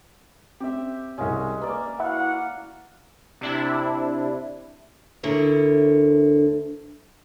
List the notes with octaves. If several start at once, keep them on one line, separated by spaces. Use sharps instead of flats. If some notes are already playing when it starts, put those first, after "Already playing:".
C4 G4 E5
C2 C3 G#3 C#4
A#3 B4 D5
E4 F#4 F5 F#5
C3 D4 E4
D2 D3 E4 A#4 C#5